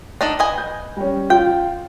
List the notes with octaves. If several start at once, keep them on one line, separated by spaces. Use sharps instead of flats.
D4 D#4 A4 A#6 F#7
B4 D#5 G#5
G6
G3 C#4
F4 G5